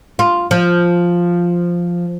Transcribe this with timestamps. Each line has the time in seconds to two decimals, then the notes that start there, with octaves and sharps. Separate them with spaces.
0.19 F4
0.51 F3